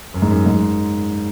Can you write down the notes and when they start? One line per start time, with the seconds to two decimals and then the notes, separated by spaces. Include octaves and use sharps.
0.14 F#2
0.22 G#2
0.30 F#2
0.46 G#2